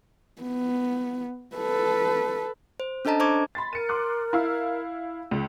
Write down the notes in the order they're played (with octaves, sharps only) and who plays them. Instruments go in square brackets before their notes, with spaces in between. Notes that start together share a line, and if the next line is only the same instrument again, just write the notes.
[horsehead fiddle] B3
A4 B4
[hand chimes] C5
C#4 D4 A4 D#5 A5 A#5
D4 C5 A#5 C#6 D6 G#6
[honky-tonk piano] B5 C6 A6
[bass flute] A#4 [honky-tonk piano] C#7 D#7
[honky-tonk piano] C6 D6 F#6
E4 F5 E6
C#2